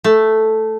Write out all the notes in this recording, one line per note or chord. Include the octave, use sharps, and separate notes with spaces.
A3